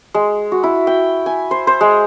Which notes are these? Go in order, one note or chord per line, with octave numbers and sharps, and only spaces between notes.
G#3
F#4
E4
G5
G#5
C5
C5
G#3